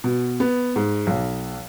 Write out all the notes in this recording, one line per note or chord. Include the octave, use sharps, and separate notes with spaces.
B2
B3
G#2
B1